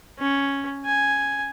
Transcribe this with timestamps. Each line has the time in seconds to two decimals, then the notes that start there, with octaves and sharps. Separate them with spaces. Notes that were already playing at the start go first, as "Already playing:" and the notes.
0.19 C#4
0.85 G#5